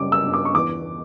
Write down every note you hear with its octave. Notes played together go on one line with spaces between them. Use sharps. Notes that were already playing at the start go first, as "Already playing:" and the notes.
Already playing: F#2 C#3 G3 D6
E6
G1
D6
C#6
E2 D6